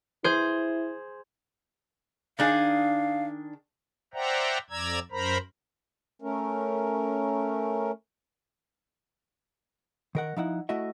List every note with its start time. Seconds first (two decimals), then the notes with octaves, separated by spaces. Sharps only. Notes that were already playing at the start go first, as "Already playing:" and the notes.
0.24 E4 G#4 C5
2.39 D#3 D4 G#4 F5
4.14 C5 D5 E5 F#5 G5 A#5
4.70 F2 D5 A#5 E6 G#6
5.11 F#2 A#4 C5 A#5 B5
6.22 A3 C#4 A#4
10.15 D#3 A#4 F#5
10.37 F3 D#4 E4 F#5
10.69 A3 E4 F#4 D#5 E5